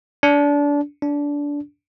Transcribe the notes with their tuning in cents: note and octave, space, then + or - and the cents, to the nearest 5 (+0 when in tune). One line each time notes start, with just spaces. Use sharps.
D4 -25
D4 -20